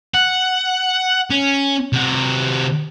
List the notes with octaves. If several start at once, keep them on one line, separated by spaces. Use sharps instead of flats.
F#5
C#4
C3 F#4